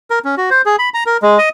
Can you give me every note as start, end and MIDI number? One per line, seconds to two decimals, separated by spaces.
0.10 0.19 70
0.25 0.35 61
0.37 0.50 66
0.51 0.62 72
0.66 0.76 68
0.79 0.89 83
0.94 1.04 82
1.06 1.17 70
1.22 1.38 56
1.38 1.49 75